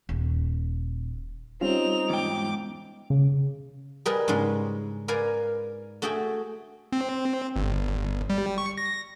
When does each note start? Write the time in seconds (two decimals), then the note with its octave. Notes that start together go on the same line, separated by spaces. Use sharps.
0.09 D#1
1.61 G3 C4 C#4 D#4 F4 F7
2.10 E2 G#2 G5 D6
3.10 C#3
4.06 G3 G#4 A#4 B4 D#5
4.28 G#2 C#3 G3 G#3
5.08 A#4 B4 D5 F5 G#5
6.02 A3 F#4 G#4 A4 G5
6.92 C4
7.56 G1
8.30 G3
8.58 C#6
8.78 A#6